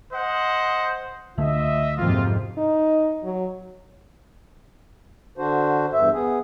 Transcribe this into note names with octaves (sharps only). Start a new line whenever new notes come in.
C5 D#5 F#5
C#2 D3 A3 F4 D#5 E5
F2 G#2 C3 F#3 A#3 F4
D#4
F#3
D3 D4 F#4 C5
E2 G2 E5
B3 G#4